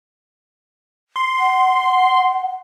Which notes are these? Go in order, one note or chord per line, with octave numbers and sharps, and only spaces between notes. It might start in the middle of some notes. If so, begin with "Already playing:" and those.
C6
F#5